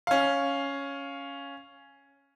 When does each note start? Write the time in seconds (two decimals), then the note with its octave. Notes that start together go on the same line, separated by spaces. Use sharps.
0.07 C#4 F5